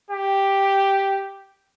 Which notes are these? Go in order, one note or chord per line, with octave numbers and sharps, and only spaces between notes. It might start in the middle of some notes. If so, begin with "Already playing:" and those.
G4